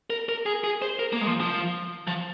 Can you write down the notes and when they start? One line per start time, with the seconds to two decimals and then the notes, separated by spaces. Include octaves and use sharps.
0.10 A#4
0.29 A#4
0.46 G#4
0.64 G#4
0.82 C5
0.99 A#4
1.13 A#3
1.21 G#3
1.27 F3
1.41 F3
2.07 F3